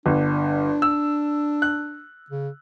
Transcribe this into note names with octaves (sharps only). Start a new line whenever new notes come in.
G1 D4
E6
F#6
C#3